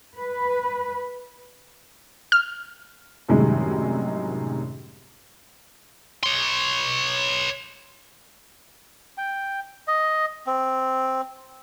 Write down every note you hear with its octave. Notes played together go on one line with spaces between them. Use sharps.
B4
F6
F#2 A2 C3 D#3 G3 G#3
C#5 C6
G5
D#5
C4